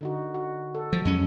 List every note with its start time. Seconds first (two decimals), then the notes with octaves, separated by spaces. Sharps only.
0.01 D3 D#4 F#4
0.34 F#4
0.75 A4
0.93 F3
1.05 F2 F#3 G#3 C#4